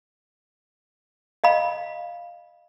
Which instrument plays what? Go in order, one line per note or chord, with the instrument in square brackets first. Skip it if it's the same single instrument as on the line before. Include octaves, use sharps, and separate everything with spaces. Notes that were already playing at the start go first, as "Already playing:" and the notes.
[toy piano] D#5 F5 B5